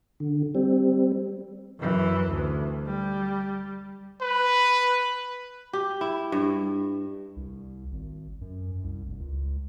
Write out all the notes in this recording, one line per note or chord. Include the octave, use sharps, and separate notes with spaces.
D3
G3 C4
F#2 E3
D2
G3
B4
G4
E4
G2
C2
G#1
F#2
C2
F1
C#2